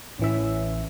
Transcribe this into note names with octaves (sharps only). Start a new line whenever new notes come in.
A1 E3 C#4 E5